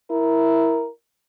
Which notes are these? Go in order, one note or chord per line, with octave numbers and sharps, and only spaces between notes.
E4 A#4